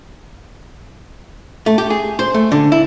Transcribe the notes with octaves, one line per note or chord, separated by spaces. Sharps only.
A3
G4
G#4
C5
A3
D3
E4